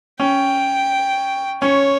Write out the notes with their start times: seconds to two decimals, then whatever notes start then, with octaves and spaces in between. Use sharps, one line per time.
0.20 C#4 G5
1.62 C#4 C#5